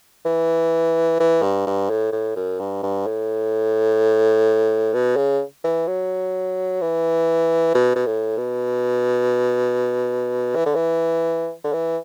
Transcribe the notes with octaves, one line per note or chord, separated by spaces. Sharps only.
E3
E3
G2
G2
A2
A2
F#2
G2
G2
A2
B2
C#3
E3
F#3
E3
B2
B2
A2
B2
E3
D3
E3
D3
E3